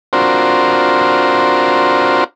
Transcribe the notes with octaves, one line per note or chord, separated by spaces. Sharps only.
C4 D4 F4 F#4 A#4 C5